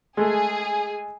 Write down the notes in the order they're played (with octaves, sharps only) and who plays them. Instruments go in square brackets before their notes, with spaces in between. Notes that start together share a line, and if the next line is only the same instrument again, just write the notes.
[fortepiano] G#3 A3 [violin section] G#4